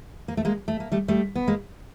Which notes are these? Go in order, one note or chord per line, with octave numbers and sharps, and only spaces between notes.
A#3
A3
G#3 A#3
A3
A#3
G3 A3
G3 A3
B3
G#3 A#3